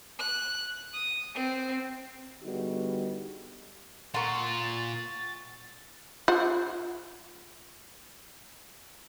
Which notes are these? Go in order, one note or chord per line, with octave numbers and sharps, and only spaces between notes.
F#6
D#6
C4
D3 G3 B3 D#4 F#4 G#4
A#2 F4 A#4 F#5 C6 C#6 A6
F4 C5 F#5